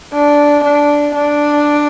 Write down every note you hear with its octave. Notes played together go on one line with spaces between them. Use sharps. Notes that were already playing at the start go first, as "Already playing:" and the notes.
D4
D4
D4